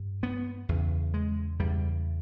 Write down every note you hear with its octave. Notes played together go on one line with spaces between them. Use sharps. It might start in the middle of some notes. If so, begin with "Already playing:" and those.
Already playing: G2
B3
E2 C#3
G#3
E2 C#3 G3